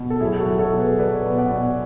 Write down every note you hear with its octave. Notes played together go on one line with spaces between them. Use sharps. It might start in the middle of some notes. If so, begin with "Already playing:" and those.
Already playing: B2
A4
F#3 E4 G#4
F#4 A4
F#3
A4 C#5
B2
G#4 B4
F#3 B4 D5
B2
D5 F#5
B2